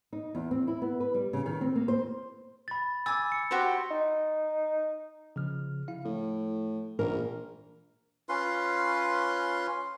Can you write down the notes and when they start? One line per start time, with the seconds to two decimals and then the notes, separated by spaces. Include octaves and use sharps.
0.13 D#4
0.35 E2
0.51 C4
0.67 E4
0.82 B3
1.00 B4
1.15 G3
1.33 C#3
1.46 D#3
1.61 C4
1.76 A#3
1.88 C5
2.68 B5 A6
3.06 G#5 D6 E6 A6
3.32 C#7
3.51 F#4 G4 C5
3.91 D#4
5.36 C#3 F3 F6
5.88 E4 F5
6.05 A2 F3
6.99 A#1 A#2 E3 A#4
8.29 C#4 F4 B4 C6